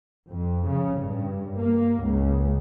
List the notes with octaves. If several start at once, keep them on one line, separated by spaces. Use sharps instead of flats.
F2
C#3
G2
A#3
C#2